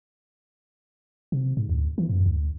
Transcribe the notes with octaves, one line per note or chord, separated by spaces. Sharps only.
C3
G#2
D2
E3
F#2
D2